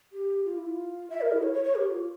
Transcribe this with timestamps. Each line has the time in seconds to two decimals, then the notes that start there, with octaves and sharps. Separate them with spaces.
0.13 G4
0.45 F4
0.57 E4
0.67 F4
1.10 E5
1.21 A#4
1.32 E4
1.42 C#5
1.54 C#5
1.64 C#5
1.75 G4
1.91 F4